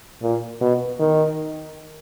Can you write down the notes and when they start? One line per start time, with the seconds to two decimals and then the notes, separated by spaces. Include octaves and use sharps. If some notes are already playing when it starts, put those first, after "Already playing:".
0.22 A#2
0.61 B2
1.00 D#3